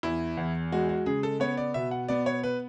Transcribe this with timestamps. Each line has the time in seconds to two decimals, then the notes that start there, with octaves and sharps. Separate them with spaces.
0.03 E2 E4
0.37 E2
0.72 G#3 F#4
0.89 F#4
1.06 C#3 G#4
1.23 A4
1.40 B3 C#5
1.57 D5
1.74 B2 E5
1.91 F#5
2.08 B3 D5
2.26 C#5
2.44 B4